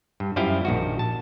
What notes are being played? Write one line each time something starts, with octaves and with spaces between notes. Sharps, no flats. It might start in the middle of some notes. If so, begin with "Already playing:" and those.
G2
F#2 F3 G3 E4 F5 G5
A#1 D#3 F#4
A5